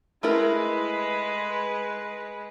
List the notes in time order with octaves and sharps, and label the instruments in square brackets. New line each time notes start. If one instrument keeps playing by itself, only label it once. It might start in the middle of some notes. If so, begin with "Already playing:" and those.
[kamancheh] G#3 B4 [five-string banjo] A3 E4 A#4